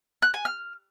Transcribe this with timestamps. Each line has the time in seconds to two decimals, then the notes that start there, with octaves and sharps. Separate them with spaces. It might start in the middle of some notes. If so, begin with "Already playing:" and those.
0.22 F#6
0.34 G#5
0.45 F6